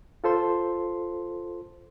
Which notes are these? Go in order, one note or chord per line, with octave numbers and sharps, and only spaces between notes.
F4 A4 C5 C6